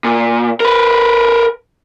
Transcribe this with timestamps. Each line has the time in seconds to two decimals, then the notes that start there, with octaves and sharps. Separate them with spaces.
0.05 A#2
0.60 A#4 B4